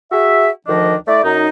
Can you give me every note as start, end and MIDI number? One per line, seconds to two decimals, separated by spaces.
0.12 0.49 66
0.12 0.49 68
0.12 0.49 76
0.67 0.95 38
0.67 0.95 51
0.67 0.95 53
0.67 0.95 62
0.67 0.95 75
1.07 1.22 57
1.07 1.22 64
1.07 1.22 74
1.24 1.48 42
1.24 1.48 63